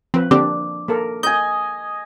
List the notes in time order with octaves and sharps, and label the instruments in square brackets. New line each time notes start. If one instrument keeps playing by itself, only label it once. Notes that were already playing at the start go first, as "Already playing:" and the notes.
[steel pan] F3 B4 [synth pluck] C4
[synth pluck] D3 C4 G4 [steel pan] A#3 D4 [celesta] D6
[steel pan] A#3 A4 A#4
[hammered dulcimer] D#5 G#5 [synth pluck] G6